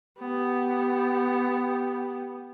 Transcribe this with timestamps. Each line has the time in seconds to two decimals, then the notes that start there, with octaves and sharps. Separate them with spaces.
0.20 B3 G4